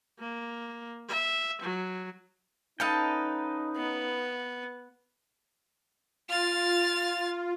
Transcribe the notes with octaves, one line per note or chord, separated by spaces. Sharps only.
A#3
E5
F#3
C#4 D#4 A4 B4 D#5 F5 G5 A5
B3
F4 F6 A6